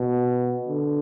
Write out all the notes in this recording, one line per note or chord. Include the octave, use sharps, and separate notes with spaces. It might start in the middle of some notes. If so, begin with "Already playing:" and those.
Already playing: B2
D3